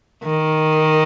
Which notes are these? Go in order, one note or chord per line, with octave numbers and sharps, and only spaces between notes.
D#3